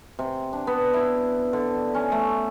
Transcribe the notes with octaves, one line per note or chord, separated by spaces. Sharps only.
C3
D4
B3
E4
D3
C#4
A3